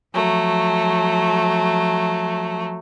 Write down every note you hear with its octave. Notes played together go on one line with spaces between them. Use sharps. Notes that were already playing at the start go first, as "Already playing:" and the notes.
F3 F#3 A3